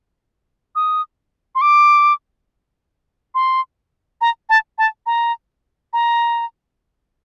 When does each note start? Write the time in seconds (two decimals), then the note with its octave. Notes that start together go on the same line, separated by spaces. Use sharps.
0.76 D#6
1.55 C6
1.61 D6
3.35 C6
4.21 A#5
4.49 A5
4.78 A5
5.06 A#5
5.93 A#5